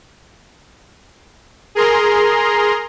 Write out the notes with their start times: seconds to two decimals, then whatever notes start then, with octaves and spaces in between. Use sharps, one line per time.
1.75 G#4 A#4 A#5 C6